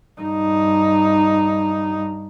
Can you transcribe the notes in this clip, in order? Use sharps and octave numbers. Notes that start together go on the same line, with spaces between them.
G2 D#4